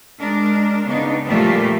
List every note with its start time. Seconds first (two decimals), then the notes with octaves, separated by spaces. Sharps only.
0.19 G#3 D4 A#4
0.85 C#3 B3 D4 D#4
1.26 A#2 F3 G3 A3 A#3 F4